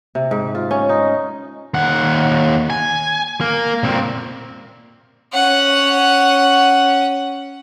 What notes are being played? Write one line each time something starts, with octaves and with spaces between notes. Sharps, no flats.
C3
G#2
F4
C#4
D#4
D#2 F#5
G#5
A#3
A#2 C4
C#4 F#5